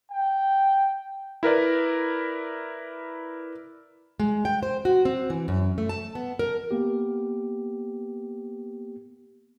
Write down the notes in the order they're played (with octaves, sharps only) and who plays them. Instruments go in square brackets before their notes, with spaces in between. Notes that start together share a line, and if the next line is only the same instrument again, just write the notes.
[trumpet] G5
[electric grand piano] E4 A#4 B4 D5
[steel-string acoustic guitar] G#3
G5
C5
F#4
C4
E3
F#2
A3
A5
B3
A#4
[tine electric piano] A#3 B3 G4